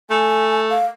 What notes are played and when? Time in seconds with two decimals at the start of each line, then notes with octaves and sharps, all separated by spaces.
0.10 A3 G#5
0.70 F5